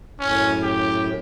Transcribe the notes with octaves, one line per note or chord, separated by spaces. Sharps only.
F#2 A2 C#4
G4